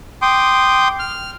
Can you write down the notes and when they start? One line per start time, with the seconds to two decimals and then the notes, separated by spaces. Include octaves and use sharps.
0.22 G5 C6 D6 D#6
0.99 F6